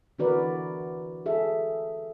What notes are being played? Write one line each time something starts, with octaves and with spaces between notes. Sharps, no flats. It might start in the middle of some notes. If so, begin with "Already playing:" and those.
D3 E3 F#4 A#4 B4 D5
G#4 A4 E5